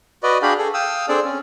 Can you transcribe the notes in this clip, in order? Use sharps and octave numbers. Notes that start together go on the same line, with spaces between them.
F#4 B4 D5 D#5
D4 F#4 G#4 F5 G5 B5
G#4 A4
F5 G5 D#6 E6
C4 D4 G#4 A4 D5
C#4